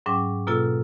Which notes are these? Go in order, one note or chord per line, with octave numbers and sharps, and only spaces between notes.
G#2 F#3 C#4 G5 D6
B2 A#3 F4 A4 E6